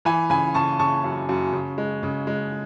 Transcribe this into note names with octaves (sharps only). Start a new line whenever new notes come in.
E3 G#5 B5
C#3 G#5 B5
C#3 A5 C#6
C#3 A5 C#6
F#2
F#2
C#3
G#3
C#3
G#3